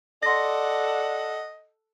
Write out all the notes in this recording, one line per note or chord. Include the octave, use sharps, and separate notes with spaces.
A4 D5 D#5 F#5 C6 A#6